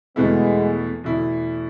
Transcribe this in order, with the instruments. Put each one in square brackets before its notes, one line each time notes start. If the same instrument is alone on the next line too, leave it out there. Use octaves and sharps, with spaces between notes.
[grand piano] E2 B2 A3 E4 [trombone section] G#3 B3
[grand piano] E2 B2 A3 E4